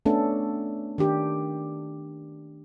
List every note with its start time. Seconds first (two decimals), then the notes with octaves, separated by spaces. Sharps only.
0.06 A3 B3 C#4 D4 A4
0.98 D#3 D4 G4